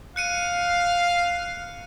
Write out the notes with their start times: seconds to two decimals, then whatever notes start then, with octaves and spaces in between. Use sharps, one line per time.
0.16 F5 F#6 C#7 D#7